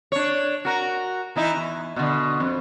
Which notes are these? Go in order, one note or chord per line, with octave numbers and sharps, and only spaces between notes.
D4 C#5
F#4 A#4
E3 D#4 E4
E2
B2 D3
F2